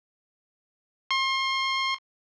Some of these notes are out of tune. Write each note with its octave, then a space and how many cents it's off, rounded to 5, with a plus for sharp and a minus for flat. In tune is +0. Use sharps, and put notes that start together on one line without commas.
C6 +35